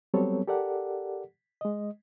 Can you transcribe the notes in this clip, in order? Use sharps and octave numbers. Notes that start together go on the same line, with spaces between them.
F#3 G3 B3 C4 A4 C#5
G4 A4 A#4 D5 F#5
G#3 D#5